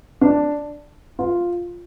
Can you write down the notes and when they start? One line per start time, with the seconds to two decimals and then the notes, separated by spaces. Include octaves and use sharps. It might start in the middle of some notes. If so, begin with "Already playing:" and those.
0.21 D4
1.19 F4